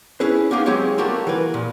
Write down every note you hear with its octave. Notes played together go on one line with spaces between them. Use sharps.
C#4 E4 G#4 B4
A#3 B3 D#4 F4 G4 G#4
F#3 G#3 C4 G4 C#5
G3 A3 A#3 F#4 G4 A4
E3 A#4 B4
A#2